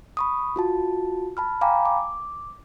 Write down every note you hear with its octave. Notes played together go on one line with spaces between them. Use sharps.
B5 C#6 D#6
F4 F#4 A5
A5 B5 F6
F5 G5 G#5 A#5 B5 D6
D6